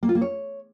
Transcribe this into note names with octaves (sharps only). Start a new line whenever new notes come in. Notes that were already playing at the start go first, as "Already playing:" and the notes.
A#3
F4
A#3
C#5